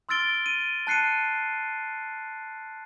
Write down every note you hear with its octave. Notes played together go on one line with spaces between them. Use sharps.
C6 E6 F6 A6 D7 G7
D#7
A5 F#6 C7 C#7 D#7